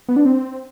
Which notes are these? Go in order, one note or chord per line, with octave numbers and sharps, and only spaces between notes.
B3
D4
C4